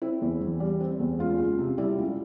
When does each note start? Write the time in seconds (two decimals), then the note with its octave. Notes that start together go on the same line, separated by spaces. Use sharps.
0.02 C4 E4
0.22 E2
0.41 E3
0.60 G3
0.81 C4
1.00 E2
1.19 C#2 F4
1.38 C#2
1.59 C3
1.78 G3 E4
1.98 C#2